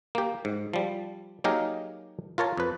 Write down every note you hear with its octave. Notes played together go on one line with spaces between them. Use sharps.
A#3 G4
G#2
F3 G3
F#3 A#3 D#4 G4 G#4 A#4
F4 A#4 C#5 A5
F2 B4